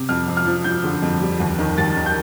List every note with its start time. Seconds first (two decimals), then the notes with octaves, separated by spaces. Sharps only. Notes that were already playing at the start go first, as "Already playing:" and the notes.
Already playing: C3
0.09 F2 F6
0.28 F2
0.37 F6
0.45 F3
0.64 F3 G6
0.84 D3
1.02 F2
1.21 G3
1.40 D#2
1.59 D#3
1.78 D#2 A6
1.97 D#3
2.06 G6